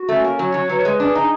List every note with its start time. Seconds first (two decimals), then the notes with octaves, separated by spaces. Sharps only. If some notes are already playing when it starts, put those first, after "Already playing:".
Already playing: F#4
0.09 A3 C#4
0.24 A#3
0.39 F#3 C#5
0.54 F#3
0.69 F#3 B4
0.85 G#3
1.00 D4 G#4
1.15 D#4